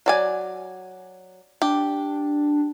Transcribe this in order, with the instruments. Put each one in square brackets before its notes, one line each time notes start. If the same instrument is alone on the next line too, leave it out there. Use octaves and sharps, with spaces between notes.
[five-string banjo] F#3 D5 G#5
[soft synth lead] D4 [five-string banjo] G4